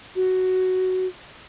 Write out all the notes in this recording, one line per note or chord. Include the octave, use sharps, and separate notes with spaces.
F#4